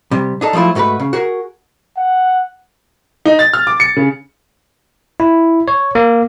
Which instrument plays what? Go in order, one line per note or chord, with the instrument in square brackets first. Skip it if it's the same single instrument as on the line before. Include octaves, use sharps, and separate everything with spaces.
[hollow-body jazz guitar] C3 G3
D4 D#4 A4
F3 F#3 A3 E4 F4
G#2 A3 F#4 A#4 B4
C#3
F#4 G#4 A#4
[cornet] F#5
[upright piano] D#4
A6
F6
D6
C#7
C#3
[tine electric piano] E4
C#5
A#3